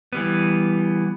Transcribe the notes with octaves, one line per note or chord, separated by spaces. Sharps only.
E3 G3 B3